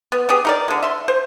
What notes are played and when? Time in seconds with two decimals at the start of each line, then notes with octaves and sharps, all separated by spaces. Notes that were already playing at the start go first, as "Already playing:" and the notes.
0.12 B3
0.29 B3 G4 G#4
0.45 D#4 A#4 D5
0.68 D3 G#3
0.83 E5 C6
1.08 C5